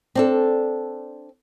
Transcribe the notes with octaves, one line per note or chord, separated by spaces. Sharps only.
C4 D4 A4